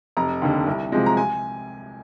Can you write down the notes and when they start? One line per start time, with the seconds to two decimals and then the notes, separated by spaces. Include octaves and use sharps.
0.17 F1 A#5
0.42 D#2 D3
0.67 C2
0.92 C3 F3 G#3
1.06 A#5
1.17 G#5